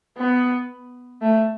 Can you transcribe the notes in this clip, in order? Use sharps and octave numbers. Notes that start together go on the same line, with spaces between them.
B3
A3